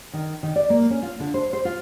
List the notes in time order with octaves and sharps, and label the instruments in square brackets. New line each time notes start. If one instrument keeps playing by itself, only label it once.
[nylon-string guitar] D#3
D#3
D5
A#3
C#4
F4
D3
C5
C5
F4